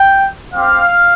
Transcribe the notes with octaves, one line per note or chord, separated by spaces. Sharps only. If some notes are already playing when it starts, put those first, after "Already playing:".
Already playing: G5
C4 G4 F5